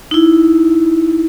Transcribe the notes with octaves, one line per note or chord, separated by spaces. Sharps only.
D#4 E4